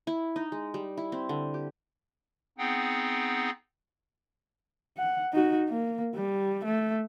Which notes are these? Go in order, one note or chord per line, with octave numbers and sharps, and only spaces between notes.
E4
D#4
G#3
G3
E4
C4
D3
G4
B3 C4 D#4 G#4 F#5 G5
F#5
D#4 F#4
A#3
G3
A3